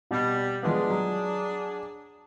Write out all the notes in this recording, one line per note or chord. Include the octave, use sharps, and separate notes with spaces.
B2 G3
F3 G#3 B3 D4 G#4
F#3